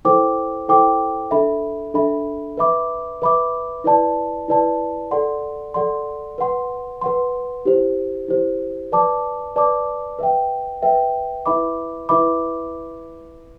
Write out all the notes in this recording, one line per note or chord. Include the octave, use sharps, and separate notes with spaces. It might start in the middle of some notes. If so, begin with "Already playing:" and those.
E4 A4 C5 G5 D6
E4 A4 C5 G5 D6
D4 A4 E5 B5
D4 A4 E5 B5
B4 E5 B5 D6
B4 E5 B5 D6
E4 B4 D5 A5
E4 B4 D5 A5
A4 D5 F#5 C6
A4 D5 F#5 C6
B4 F#5 C6
B4 F#5 C6
E4 G4 C5
E4 G4 C5
B4 D5 A5 D6
B4 D5 A5 D6
B4 E5 G5
B4 E5 G5
E4 B4 E5 B5 D6
E4 B4 E5 B5 D6